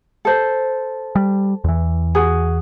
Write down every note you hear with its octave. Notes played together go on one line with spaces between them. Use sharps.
A4 C5
G3
E2 E3
F#4 G#4